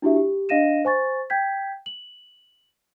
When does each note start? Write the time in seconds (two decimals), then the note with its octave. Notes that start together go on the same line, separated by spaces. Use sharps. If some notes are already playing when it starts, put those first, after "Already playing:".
0.02 D4 E4 F#4 G4 E5
0.16 G4
0.49 D4 D#5 F5 A#6 D#7 E7
0.85 C5 G#5 C#6 A6
1.30 G5 G6 G#6 B6
1.86 F#7